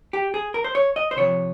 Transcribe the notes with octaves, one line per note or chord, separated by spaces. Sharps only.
G4
G#4
A#4
C5
C#5
D#5
C5
C3 F3 C#5